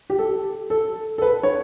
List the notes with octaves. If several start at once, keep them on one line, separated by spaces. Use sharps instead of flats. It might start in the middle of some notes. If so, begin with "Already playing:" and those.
G4
A4
A4
A4
B4
C#5